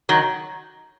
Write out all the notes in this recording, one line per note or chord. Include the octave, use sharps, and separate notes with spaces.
D#3 F#3